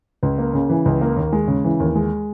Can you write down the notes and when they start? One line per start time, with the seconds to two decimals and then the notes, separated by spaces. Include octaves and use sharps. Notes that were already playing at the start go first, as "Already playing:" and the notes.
0.23 C#2
0.38 A#3
0.54 C#3
0.69 E3
0.86 C#2
1.01 A#3
1.17 D#2
1.32 G#3
1.48 C#3
1.64 E3
1.80 D#2
1.95 G#3